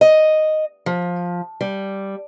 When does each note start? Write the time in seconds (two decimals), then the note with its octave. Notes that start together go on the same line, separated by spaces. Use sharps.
0.01 D#5
0.86 F3
1.61 G3